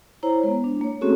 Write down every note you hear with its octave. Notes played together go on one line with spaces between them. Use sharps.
E4 C5 C#5 A#5
G#3 B3
D4
A#3 C#5
A3 C4 C#4 F#4 G#4 A4